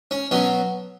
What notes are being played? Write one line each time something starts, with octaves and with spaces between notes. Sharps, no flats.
C#4
B2 F#3 C#4